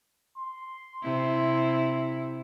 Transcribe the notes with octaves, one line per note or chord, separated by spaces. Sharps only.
C6
C3 E4